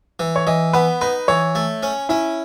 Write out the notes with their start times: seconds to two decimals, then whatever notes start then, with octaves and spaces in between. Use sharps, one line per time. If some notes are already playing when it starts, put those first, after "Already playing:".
0.19 E3
0.36 C#5
0.47 E3 D#5
0.73 B3 B4
1.01 D#4 B4
1.28 E3 C#5
1.55 A3
1.83 C#4
2.09 C#4 E4